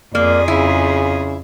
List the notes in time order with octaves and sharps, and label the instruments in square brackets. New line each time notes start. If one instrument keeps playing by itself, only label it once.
[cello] F2 G#4 [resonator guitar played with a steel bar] A#3 [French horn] D5
[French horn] C#3 [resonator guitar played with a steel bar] E4